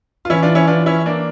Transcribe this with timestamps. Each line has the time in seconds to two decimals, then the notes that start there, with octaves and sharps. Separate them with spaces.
0.25 F4
0.30 E3 C#4 E4
0.43 D4 F4
0.55 C#4 E4
0.67 D4 F4
0.86 C#4 E4
1.06 A#3 D4